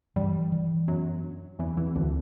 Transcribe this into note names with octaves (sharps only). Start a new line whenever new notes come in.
G2 E3 G3
E3
F#2 F#3 B3
D4
E2 E3 C4
E2 E3
D2 D3 C4